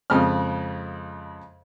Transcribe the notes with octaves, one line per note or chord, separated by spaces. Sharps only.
F2 C#3 G#3 D#5 B5 F6